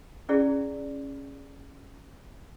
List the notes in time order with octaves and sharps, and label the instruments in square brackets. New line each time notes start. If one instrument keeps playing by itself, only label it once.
[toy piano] C#4 E4 G#4 D5